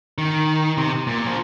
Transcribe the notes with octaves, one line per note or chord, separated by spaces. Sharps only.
D#3
C3
A#2
F3